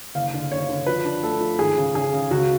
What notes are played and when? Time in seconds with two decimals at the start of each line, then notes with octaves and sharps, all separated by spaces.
0.15 F#1 F5
0.34 D3
0.51 F#1 C#5
0.69 D3
0.86 F3 B4
1.05 D4
1.23 A3 A4
1.41 F3
1.59 G#1 G#4
1.78 C#3
1.95 C#3 G#4
2.13 C#3
2.31 C#2 F#4